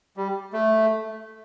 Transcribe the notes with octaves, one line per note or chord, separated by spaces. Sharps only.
G3
A3